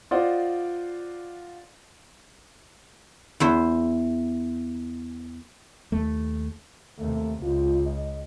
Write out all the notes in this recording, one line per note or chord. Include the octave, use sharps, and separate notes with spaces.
F4 C5 D5 D#5 F#5
E2 E4 C5
D#2 A3
D#2 C3 A3
C#2 F4
D#5